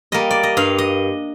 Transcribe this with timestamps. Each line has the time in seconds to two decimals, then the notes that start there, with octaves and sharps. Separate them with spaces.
0.12 G3 A#3 D#5
0.31 D5
0.43 D#5
0.57 G2 F5
0.78 D#5